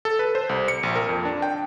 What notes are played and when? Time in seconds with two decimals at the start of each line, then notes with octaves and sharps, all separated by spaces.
0.05 A4
0.19 B4
0.35 C5
0.49 C2
0.68 C#7
0.83 A#1
0.96 A#4
1.09 F2
1.25 D4
1.42 G5